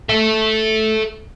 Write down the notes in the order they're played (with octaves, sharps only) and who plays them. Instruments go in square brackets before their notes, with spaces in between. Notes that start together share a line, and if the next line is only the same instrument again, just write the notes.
[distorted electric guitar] A4 E5